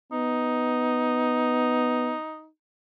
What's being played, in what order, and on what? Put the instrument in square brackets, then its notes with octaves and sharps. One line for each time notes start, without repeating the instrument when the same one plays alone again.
[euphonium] B3 [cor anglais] D#4